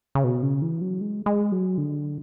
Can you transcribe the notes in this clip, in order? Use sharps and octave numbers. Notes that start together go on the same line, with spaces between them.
C#3
B2
C#3
E3
F#3
G#3
G#3
F#3
D3